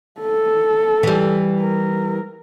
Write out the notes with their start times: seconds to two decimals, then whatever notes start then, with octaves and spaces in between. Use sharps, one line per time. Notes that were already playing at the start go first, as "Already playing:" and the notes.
0.21 A4
1.03 E3 G3
1.61 A#4